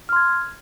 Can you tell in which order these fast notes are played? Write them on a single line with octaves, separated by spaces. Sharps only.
F6 C6 G#6